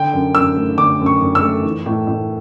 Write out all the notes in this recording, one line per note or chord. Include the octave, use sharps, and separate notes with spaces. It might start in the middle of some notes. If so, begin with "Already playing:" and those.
Already playing: D3 G5
F#2
F#2 E6
A3
D3 D6
F#2
C#6
F#2
E6
A3
E3
A2
A2